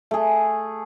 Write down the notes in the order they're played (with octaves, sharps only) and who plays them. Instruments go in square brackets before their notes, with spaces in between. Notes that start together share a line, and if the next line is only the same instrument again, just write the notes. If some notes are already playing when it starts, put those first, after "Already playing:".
[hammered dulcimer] A3 G#4